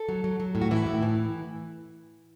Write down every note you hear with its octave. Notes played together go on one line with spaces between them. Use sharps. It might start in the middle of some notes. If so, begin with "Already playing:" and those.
Already playing: A4
F#3
F#3
F#3
A2
F#4
E3 E4
A2
E3